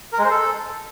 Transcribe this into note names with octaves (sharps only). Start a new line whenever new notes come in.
A#4
G#3
C5
A4